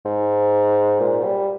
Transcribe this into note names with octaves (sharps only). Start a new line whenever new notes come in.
G#2
A#2
G3